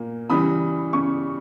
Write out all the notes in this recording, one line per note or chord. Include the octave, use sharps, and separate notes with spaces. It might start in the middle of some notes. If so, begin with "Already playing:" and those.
Already playing: A#2 A#3
C#3 E3 G3 B5 D#6
C#3 C#6